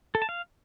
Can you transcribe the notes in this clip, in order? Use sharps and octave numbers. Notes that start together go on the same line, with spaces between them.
A4
A5
F5